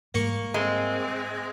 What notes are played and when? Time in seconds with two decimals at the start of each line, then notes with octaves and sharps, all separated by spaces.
0.14 G#2 G3 A#3 C#6
0.54 G#3 C4